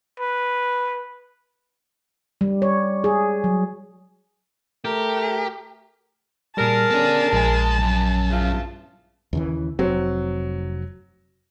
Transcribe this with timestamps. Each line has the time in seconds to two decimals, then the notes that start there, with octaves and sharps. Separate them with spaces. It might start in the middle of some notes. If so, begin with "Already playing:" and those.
0.20 B4
2.41 G3
2.62 C#5
3.04 G#4
3.44 F#3
4.85 A3 G4 A#4
6.57 A#2 G3 G#4 A#4 A5
6.91 B3 C#4 A4 D5
7.33 A#1 G#3 G#5
7.80 F#2
8.30 C#3 E3 F4
9.33 D#2 C#3 E3
9.79 F1 F#3 C4